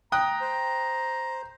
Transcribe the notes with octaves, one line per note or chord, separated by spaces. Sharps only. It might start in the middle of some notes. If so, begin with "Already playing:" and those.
G5 A#5 D#6 F#6
C5